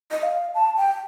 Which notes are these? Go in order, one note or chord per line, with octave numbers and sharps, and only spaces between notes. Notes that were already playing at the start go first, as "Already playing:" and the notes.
D#5
F5
A5
G5